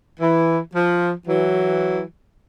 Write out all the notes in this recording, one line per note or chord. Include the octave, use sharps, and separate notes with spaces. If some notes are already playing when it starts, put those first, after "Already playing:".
E3
F3
E3 F#3